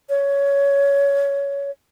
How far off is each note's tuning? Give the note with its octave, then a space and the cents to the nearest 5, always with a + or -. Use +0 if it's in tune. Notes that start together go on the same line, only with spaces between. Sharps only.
C#5 +15